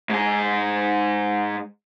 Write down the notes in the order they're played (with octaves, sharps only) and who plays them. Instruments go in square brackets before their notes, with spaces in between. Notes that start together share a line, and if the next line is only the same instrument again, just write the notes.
[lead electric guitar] G#2 G#4